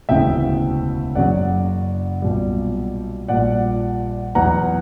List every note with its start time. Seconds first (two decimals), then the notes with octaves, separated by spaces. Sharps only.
0.09 E1 D2 C#3 E3 E5 G5
1.15 F#1 F#2 C#3 F#3 D5 F#5
2.22 B1 A#2 G3
3.28 A#1 A#2 G3 D5 F#5
4.35 E2 B2 F#3 F#5 A#5